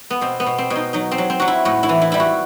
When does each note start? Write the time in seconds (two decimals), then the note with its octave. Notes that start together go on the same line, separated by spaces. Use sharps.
0.10 B3
0.21 B2 C4
0.40 B3
0.46 B2
0.58 C4
0.70 B2
0.76 D#4
0.93 F#3 D#4
1.11 C4
1.18 F#3
1.30 C4
1.40 F#3 F#4
1.48 E4
1.65 A2 F#4
1.83 E4
1.89 E3
2.01 E4
2.12 G3 E4
2.20 F#4